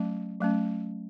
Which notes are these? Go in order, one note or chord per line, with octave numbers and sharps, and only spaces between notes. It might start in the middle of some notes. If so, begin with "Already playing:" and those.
Already playing: F#3 A3 C#4
F#3 A3 C#4